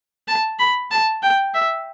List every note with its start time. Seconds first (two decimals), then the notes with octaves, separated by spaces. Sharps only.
0.28 A5
0.59 B5
0.91 A5
1.23 G5
1.54 E5